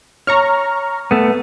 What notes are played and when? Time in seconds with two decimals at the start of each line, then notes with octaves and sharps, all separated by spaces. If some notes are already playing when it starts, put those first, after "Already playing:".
0.27 C#5 A#5 C#6 F6
1.11 A3 B3